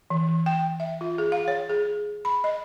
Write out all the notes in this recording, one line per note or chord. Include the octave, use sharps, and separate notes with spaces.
E3
G5
E5
F4
G#4
F5
C#5
G#4
B5
D#5